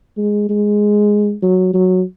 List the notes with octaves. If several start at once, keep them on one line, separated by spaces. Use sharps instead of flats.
G#3
G#3
F#3
F#3